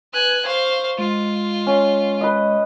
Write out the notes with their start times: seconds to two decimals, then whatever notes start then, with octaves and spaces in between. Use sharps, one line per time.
0.14 B4 G#5 F#6
0.45 C5 F5 C#6
0.99 G#3 F4
1.67 C#4
2.21 B4 D#5